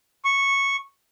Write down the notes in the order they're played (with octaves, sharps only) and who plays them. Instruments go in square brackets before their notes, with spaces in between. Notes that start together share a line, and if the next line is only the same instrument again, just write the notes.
[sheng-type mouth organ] C#6